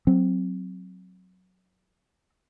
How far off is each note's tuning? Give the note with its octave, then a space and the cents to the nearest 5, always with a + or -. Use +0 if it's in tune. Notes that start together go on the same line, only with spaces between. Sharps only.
F#3 +0 C4 +0